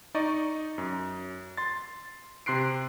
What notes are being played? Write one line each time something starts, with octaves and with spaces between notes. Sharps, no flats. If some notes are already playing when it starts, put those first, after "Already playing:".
D#4 D5 D#5 C#6
F#2
C6 A6
C3 C6 F#6 C7 D7